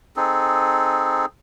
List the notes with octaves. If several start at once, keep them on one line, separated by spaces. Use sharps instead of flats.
C4 D#4 G#4 A4